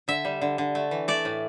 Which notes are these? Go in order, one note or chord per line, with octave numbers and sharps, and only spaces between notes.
D3 E5
G3
D3
D3
A3
E3
A3 D5
A2